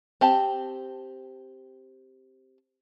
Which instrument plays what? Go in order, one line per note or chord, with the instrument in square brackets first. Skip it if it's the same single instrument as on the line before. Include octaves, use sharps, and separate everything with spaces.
[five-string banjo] C4 G4 A5